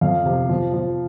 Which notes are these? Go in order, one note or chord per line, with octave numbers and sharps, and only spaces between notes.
F2 F5
C3
F3
F3